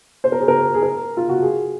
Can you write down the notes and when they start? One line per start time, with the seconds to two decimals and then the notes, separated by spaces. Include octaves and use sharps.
0.24 C5
0.32 A#4
0.40 G#4
0.48 A#4
0.74 G#4
0.83 A#4
1.17 F4
1.29 F#4
1.42 G#4